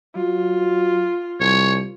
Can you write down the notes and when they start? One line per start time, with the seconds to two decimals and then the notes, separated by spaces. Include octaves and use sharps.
0.16 F#3 F4
1.40 C2 C#5